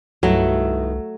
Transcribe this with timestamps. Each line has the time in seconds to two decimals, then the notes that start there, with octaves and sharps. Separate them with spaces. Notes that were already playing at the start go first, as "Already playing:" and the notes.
0.23 C2 G2 D#3 F#3 A3 E4